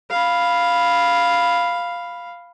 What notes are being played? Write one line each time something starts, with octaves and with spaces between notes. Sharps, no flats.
F5 B5